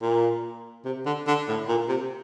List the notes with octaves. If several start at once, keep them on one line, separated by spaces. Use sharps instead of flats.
A#2
C3
D3
D3
A2
A#2
C3